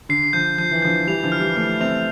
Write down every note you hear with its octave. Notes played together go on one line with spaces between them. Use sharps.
D3 C7
D3 F3 G6
F3 G6
E3
D3 F3 G6
E3 G3 F7
D3 F3
F6
E3 G3
F3 A3 F6
A3 C4 F7